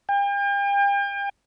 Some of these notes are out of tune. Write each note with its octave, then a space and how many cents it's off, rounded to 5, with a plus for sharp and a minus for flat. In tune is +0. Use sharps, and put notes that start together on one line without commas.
G5 +40